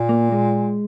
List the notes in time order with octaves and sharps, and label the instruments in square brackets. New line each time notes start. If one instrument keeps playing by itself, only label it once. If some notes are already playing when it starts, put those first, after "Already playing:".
Already playing: [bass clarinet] A#2
[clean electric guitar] A#3
G#3